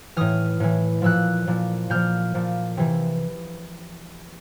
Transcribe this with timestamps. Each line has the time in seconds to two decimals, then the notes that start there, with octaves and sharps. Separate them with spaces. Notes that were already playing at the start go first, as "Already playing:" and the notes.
0.16 A2 E3 D#6 F6
0.60 A2 E3
1.02 A#2 F3 E6 F#6
1.47 A#2 F3
1.90 A#2 F3 F6 G6
2.35 A#2 F3
2.77 C3 E3